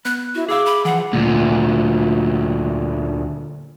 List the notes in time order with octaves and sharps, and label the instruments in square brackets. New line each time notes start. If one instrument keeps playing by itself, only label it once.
[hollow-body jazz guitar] B3 [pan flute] F#6
[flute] E4 [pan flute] F#4
[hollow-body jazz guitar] G#4 F5 [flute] D6 [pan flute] E6
[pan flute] B5
[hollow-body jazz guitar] E3 F3 [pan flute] G#4 [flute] F#5
[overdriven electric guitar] D2 A#2